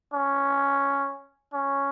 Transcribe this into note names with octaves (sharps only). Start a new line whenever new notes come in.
C#4
C#4